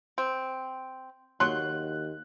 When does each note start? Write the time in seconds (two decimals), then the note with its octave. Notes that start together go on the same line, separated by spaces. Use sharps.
0.18 C4
1.40 D#2 F#3 C6 F#6